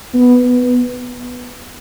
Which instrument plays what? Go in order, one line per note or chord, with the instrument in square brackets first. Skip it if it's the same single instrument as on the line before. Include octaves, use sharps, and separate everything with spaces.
[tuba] B3